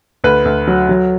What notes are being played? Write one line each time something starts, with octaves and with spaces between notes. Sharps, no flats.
D2 B4
D2
F#3
F#3